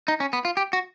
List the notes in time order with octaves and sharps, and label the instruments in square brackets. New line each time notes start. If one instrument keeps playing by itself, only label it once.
[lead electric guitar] D#4
C#4
B3
F4
G4
F#4